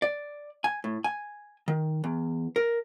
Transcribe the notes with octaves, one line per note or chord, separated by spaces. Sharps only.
D5
G#5
A2
G#5
D#3
E2
A#4